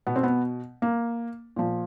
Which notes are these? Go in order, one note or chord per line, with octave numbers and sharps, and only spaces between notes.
B2 B3
C4
B3
A#3
A#2 F3